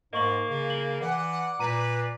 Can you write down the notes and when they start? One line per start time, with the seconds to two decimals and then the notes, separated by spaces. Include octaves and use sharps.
0.13 G#2 A#3 D#5 C#6 F#7
0.49 C#3
0.70 F#7
1.01 E3 D5 F#5
1.59 A#2 B4 A#5 D#7